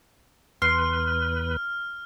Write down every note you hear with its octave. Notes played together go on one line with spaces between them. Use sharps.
E2 B4 C6 F6